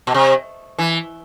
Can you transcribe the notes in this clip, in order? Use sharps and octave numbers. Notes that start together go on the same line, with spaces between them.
B2
C3
E3